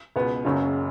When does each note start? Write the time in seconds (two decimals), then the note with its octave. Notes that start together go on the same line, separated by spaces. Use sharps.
0.16 C#2 B2 B3
0.45 F#1 F#2 C#3 F#3